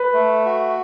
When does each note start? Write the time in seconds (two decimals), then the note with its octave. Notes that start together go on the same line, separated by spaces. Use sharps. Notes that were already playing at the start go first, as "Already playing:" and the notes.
Already playing: B4
0.14 A3
0.45 F#4